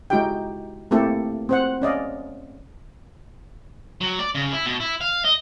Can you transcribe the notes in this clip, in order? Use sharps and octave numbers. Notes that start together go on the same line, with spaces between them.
G#3 D#4 E4 F#4 G4 G5
A3 A#3 C4 E4 G4 A4
C4 C5 F#5
C#4 D5 D#5 F5
F#3
D5
C#3
E4
B2
E4
F5
D#5